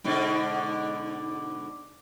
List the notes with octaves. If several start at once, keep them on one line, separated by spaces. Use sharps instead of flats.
G#2 B2 D3